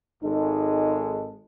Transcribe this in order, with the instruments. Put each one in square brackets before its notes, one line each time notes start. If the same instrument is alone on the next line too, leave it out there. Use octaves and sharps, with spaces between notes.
[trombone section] G#1 G#3 A4 [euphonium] D#4